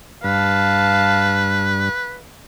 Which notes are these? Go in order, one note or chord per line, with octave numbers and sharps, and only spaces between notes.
G2 B4 F5 A5